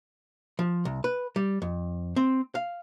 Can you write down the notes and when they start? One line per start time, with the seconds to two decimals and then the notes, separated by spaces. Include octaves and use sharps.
0.59 F3
0.85 C2
1.04 B4
1.36 G3
1.62 F2
2.16 C4
2.55 F5